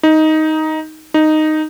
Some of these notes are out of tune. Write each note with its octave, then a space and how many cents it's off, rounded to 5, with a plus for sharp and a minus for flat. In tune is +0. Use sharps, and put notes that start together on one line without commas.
D#4 +10
D#4 -5